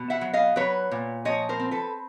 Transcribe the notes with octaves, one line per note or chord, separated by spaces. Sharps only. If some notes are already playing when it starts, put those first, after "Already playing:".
Already playing: B2
E5 F#5
F#3
D#5 F5
F#3 B4 C#5
A#2
F3 C#5 D#5
A#4 C5
C4
A4 B4